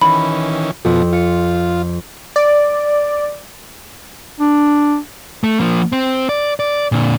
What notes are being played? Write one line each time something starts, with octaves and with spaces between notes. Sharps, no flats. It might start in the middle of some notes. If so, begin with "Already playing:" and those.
D#3 E3 C#4 B5
F2 B2 F3
F4 C#7
D5
D4
A3
F3 A#3
C4
D5
D5
A#2 D3